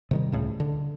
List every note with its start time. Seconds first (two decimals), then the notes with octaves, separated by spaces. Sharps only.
0.11 C3 D#3 G3
0.32 C#2 A2 C#3
0.60 D3